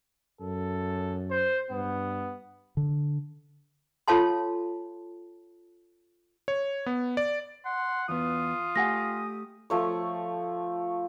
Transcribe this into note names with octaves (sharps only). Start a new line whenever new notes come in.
F#2 A4
C5
G2 B3
D3
F4 A4 C#5 F5 A5 C6
C#5
B3
D5
F#5 C6
E2 B3 F4 D#6
A3 G4 F#5 G#5 A#6
F3 A3 C#5